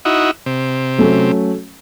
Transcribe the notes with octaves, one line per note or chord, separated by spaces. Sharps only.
D#4 E4 F#4
C3
F#3 A3 C#4